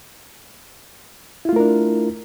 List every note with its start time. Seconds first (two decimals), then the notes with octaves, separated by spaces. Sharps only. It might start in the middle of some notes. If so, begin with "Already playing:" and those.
1.45 E4
1.49 F4
1.53 A3
1.56 A#4
1.60 D4